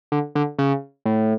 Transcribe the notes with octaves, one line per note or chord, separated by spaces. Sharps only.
D3
D3
C#3
A2